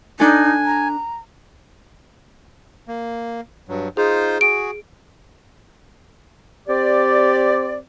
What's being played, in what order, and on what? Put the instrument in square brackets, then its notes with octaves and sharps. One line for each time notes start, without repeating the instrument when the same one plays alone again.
[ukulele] D4 A4 [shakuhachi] D#4 [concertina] G#5
[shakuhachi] A#5
[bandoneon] A#3
G2 F#3
[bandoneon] D#4 F4 C5 [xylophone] G#4
[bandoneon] F#4 G#4 [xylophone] D7
[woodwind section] C4 G4 D5